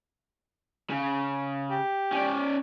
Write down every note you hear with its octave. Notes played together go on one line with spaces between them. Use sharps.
C#3
G4
C#4 D5